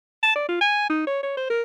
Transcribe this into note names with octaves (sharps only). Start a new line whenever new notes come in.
A5
D5
F4
G#5
D#4
C#5
C#5
C5
A#4